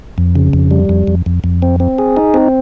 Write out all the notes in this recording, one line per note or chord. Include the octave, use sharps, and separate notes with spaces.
F2
C#3
F2
G3
F2
F2
F2
F2
C4
C4
G#4
D#4
C4